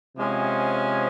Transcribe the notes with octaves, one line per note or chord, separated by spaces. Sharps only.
C3 F3 G#3 C#4